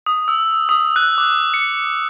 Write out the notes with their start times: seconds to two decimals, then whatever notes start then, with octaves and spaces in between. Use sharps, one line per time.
0.06 D#6
0.28 E6
0.69 D#6
0.96 F#6
1.18 D6
1.54 C#7